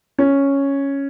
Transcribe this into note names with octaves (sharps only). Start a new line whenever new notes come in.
C#4